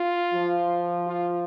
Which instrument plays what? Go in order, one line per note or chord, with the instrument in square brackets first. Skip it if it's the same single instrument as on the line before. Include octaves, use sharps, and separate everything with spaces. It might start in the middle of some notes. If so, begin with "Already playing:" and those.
Already playing: [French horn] F4
[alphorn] F3
[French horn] F4